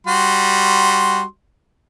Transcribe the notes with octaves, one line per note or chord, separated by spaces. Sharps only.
G3 F#4 C6